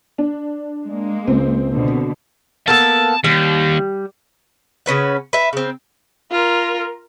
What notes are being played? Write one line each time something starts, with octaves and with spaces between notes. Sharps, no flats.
D4
G#3 A#3
C#2 C4
B2 D3
A#3 B3 A4 A5
D#2 G3
C#3 C#4 B4 F#5
B4 E5
C#3 C4
F4 A#4